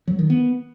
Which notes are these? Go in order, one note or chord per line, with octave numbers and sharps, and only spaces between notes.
F#3
D#3
B3